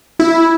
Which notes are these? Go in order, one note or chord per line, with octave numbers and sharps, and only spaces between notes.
E4